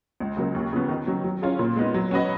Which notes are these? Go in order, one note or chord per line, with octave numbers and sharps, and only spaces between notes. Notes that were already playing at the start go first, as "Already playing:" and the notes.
C#2
C#3 F#3 A#3
D#2
C#3 F3 B3
D#3
F#3 C#4
F#3
C#4 F4 G#4
A#2
G#3 B3 D#4
F#3
C#4 F#4 B4 D#5